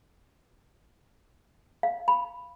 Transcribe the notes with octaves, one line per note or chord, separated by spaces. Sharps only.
F5
B5